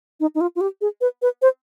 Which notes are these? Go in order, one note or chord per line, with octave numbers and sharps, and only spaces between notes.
D#4
D#4
F4
F4
G4
G#4
B4
B4
C5